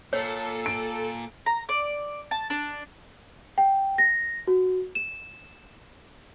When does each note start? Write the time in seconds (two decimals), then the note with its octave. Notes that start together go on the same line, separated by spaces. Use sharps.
0.13 A#2 A4 C#5
0.66 D7
1.46 A#5
1.69 D5
2.31 A5
2.50 D4
3.58 G5
3.98 A#6
4.47 F#4
4.95 E7